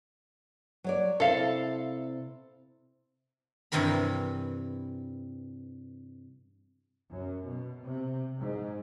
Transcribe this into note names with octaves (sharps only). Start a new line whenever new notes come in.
F#3 C#5 D5
C3 E4 A4 F5
G2 C3 E3 C4 A#4 B5
F#2
B2
C3
G#2